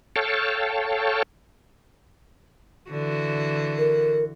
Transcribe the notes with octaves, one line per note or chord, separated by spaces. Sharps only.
A4 C#5 F5 G5 A5
D3 E3 F#4
A#4